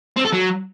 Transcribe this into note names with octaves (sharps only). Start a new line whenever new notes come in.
C4
A4
F#3